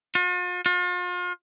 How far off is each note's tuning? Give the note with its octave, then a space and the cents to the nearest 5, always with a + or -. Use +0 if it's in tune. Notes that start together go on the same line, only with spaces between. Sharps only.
F4 +45
F4 +40